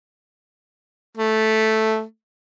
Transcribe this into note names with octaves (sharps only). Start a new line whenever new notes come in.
A3